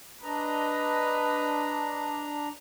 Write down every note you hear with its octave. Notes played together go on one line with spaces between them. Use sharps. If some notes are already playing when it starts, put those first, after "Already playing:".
D4 B4 D#5 A#5